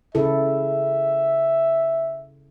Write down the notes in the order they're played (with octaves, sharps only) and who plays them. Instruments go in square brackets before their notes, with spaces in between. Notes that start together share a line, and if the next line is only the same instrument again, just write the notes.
[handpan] C#3 E4 A4 [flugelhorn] E5